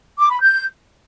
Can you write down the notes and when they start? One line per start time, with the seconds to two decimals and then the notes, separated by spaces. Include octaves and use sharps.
0.19 D6
0.30 B5
0.41 G6